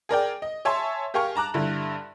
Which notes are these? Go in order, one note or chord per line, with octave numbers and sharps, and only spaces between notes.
G#4 A#4 D5 G5
D#5
C#5 E5 G#5 A5 C6
G4 A#4 F5 G#5 C#6
A5 A#5 D6 F#6
G2 D3 E4